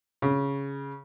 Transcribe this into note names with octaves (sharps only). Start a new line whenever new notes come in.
C#3